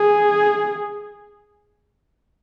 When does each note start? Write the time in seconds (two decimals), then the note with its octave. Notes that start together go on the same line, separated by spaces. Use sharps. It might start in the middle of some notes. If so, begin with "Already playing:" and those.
Already playing: G#4